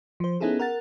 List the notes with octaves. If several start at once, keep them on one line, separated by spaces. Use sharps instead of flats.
F3 C5
B3 C#4 D#4 E4 G#4 A4
A#4 F#5 A6